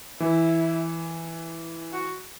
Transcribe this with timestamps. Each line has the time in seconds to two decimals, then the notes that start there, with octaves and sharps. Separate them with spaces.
0.20 E3 E4
1.92 F#4